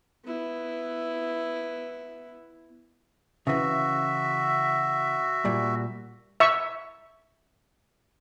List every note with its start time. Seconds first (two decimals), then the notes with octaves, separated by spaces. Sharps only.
0.25 B3 E4
3.47 C#3 E3 F#4 E5
5.45 A#2 G3
6.40 E5 C#6